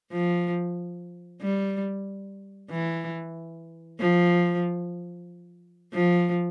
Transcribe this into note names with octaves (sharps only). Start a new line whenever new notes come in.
F3
G3
E3
F3
F3